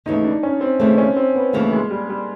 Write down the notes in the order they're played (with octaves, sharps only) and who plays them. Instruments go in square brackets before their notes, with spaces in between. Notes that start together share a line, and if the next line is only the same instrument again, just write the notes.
[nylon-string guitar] D#2 C#3 E3 A3 [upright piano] D#4
[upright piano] D4
C#4
C4
[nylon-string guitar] D#2 C#3 E3 A3 [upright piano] C4
[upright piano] C#4
C4
B3
[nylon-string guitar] D#2 C#3 E3 A3 [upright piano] A#3
[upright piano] G#3
G3
G3